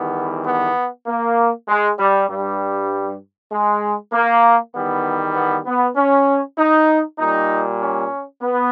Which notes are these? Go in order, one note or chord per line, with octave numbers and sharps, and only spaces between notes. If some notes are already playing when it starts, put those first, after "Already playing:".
Already playing: E2 D#3 G3 B3
B3
A#3
G#3
G3
G2 G3
G#3
A#3
E2 D#3 G3 B3
B3
B3
C#4
D#4
A#2 G3 D#4
C#4
B3